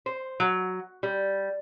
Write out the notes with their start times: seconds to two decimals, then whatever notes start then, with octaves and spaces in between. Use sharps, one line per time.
0.06 C5
0.40 F#3
1.03 G3